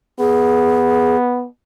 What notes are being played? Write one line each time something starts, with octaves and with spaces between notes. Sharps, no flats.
B3 G#4